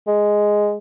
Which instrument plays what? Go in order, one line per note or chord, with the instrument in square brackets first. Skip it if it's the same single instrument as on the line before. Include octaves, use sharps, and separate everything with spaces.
[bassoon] G#3